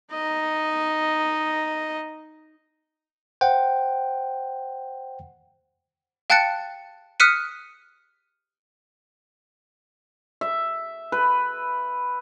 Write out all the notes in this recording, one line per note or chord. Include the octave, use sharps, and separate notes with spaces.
D#4 D#5
C5 F#5 G5
F5 G5 A5 F#6 A6 C#7
D#6 F6 F#6 B6 C#7 D#7
E5
B4